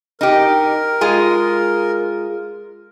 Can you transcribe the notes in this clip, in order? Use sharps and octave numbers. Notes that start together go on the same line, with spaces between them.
D#4 G4 A#4
G#3 F4 G#4